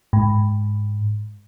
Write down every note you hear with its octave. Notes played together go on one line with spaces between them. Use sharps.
G#2